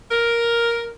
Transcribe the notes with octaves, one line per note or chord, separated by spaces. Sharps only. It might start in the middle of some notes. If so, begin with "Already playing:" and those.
A#4